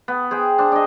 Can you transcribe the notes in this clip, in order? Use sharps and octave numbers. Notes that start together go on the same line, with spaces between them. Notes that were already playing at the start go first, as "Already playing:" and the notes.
B3
G#4 C5 G5
D4 C5
D4 D#5